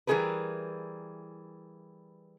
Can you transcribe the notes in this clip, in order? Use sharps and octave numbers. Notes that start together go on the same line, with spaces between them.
E3 G3 C#4 G#4 A#4 B4